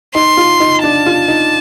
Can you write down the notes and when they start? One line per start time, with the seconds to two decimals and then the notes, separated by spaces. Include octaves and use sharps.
0.14 D#4 C6
0.37 F4
0.60 D#4
0.83 D4 A5
1.06 F4
1.28 D#4